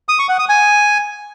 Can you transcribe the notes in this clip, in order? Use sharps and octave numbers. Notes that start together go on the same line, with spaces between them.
D#6
C#6
F#5
D#6
G#5